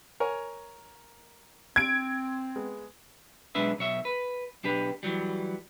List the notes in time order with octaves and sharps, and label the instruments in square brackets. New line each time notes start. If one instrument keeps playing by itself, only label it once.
[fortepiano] A#4 C#5 G#5
[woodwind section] C4 [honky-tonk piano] G#6 D7
[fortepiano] G#3 B3
[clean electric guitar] B1 G#3 D4 B4 E5
B1 C#5 E5
B4
B1 D4 G4 B4
E3 F#3 G3